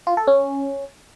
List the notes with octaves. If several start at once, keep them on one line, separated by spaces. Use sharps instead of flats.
F4
A4
C#4